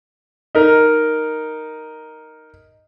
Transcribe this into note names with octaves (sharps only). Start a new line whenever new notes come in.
D#4 A#4